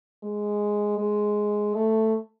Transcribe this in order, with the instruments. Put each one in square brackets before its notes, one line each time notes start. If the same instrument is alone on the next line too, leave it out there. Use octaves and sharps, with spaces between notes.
[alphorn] G#3
G#3
A3